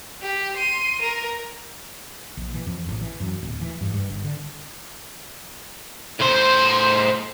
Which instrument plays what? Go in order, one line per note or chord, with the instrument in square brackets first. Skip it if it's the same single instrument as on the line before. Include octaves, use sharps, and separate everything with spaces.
[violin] G4
C6 D#7
A#4
[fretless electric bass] A#1
E3
F2
A1
E3
F#2
D1
E3
G2
G2
G1
D3
[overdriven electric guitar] A2 C5